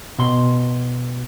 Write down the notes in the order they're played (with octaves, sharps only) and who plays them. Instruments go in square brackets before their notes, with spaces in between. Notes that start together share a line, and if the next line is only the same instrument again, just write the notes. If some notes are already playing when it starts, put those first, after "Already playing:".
[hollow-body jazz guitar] B2 C6